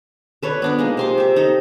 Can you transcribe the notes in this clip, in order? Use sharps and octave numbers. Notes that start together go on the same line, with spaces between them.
A4 B4 C#5 D5
B3 D4 D5
G#3 A#3 D#4
C3 C6 D6
G4 E5
D#4 A4